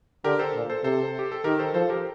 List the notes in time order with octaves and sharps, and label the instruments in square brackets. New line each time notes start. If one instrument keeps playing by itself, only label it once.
[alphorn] D3 [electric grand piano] G4 A#4
[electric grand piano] A4 C5
[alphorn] A#2
[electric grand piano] A4 C5
[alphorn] C3 [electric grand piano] A4 C5
[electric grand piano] G4
A4
[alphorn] D#3 [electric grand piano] G4 A#4
[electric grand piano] A4 C5
[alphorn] F3 [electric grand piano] A4 C5
[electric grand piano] G4 A#4